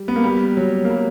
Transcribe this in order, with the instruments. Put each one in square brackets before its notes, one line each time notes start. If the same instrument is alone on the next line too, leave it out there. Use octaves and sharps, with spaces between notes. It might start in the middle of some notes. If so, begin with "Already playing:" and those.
Already playing: [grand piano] G3
B3
A#3
G3
F#3
A#3
G3